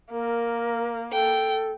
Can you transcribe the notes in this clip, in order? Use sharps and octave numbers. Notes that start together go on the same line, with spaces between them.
A#3 A#4
A4 G5